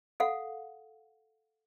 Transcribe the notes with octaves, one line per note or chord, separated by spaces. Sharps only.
A4 F5 F#5